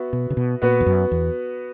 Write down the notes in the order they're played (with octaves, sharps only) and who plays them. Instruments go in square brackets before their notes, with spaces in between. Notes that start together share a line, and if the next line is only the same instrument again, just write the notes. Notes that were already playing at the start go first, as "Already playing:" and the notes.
Already playing: [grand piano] B3 F#4 B4 E5
[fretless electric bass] B2
C#3
B2
[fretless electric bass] A#2 [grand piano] B3 F#4 B4
[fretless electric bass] E2
F#2
E2